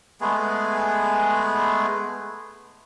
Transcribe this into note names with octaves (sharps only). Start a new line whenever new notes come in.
G#3 A3 B3 G#4